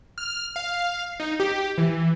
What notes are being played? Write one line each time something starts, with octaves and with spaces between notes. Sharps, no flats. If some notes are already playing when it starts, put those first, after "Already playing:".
F6
F5
D#4
G4
E3